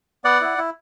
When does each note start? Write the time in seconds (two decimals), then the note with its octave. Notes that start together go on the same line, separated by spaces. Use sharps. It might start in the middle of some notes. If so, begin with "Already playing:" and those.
0.24 B3 D5 F#5
0.41 E4
0.58 E4